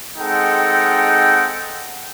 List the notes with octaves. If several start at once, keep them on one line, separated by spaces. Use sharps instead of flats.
G#3 C4 D#4 A4 F#5 G5